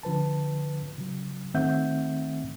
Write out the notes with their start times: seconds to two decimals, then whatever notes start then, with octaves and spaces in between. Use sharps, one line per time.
0.03 D3 F3 B4 A5
0.98 C#3 F#3
1.54 D#3 A3 C4 E5 F#5 G6